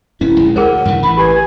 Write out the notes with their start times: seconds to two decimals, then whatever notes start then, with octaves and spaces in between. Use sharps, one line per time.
0.21 D#1 C#4 E4
0.37 A#1 G#3
0.56 D2 G#4 A#4 C5 F#5
0.85 G2 C#3 E3
1.03 A1 E3 B5
1.18 G4 B4 G#5